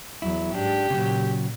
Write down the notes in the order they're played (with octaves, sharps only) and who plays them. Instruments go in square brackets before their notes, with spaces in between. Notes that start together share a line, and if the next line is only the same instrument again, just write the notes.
[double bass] E2 F#3 [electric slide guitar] E4
[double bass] G#2 [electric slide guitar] D4 [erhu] G4
[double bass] A#2 [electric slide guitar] C#3 F#3